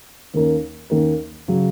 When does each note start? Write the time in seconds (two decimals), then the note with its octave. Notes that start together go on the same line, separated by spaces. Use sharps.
0.34 D#2 D#3 A#3 C#4 A#4
0.90 D#2 D#3 A#3 C#4 A#4
1.48 C#3 F#3